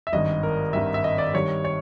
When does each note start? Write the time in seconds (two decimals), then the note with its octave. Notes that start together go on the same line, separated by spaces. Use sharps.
0.07 E5
0.12 G#1 G2 D#3 D#5
0.43 A#4
0.73 G#1 G2 D#3 E5
0.94 E5
1.04 D#5
1.18 D5
1.34 G2 D#3 G3 C#5
1.65 C#5